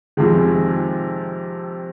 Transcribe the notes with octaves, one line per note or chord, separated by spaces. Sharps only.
F2 C3 D#3 G#3